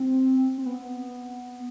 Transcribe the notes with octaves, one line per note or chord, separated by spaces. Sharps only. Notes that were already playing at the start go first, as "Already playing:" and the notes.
Already playing: C4
C4
B3